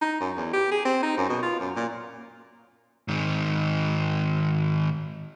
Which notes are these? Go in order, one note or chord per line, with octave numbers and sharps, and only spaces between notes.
D#4
F#2
E2
G4
G#4
C4
D#4
F#2
B2
F4
F#2
A#2
G#2 D#3